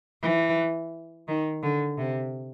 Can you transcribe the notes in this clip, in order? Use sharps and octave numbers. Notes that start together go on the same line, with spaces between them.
E3
D#3
D3
C3